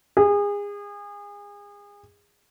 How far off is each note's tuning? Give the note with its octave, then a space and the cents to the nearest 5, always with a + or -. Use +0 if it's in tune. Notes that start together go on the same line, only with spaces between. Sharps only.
G#4 -30